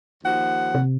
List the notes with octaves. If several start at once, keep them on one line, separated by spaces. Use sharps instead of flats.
D#2 F3 F#5
C3